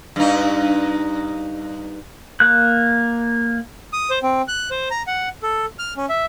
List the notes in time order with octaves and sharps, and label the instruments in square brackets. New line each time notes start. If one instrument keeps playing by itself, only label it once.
[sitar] G2 D#4
[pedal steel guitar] A#3 F#6
[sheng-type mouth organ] D#6
C5
C4
F#6
C5
A#5
F#5
A4
F6
C#4
E5